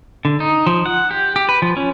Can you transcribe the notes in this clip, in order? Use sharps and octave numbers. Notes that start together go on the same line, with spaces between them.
D3
D#4
F3
F#5
G4
G4
B4
F3
C#4